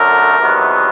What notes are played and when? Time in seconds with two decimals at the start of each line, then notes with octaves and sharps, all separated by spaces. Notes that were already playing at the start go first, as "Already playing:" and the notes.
Already playing: F#2 D3 F#3 A3 A#4
0.38 E2 C3 D#3 F#3 B3